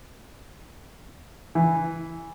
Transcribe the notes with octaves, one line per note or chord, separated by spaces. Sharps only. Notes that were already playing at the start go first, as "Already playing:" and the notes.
E3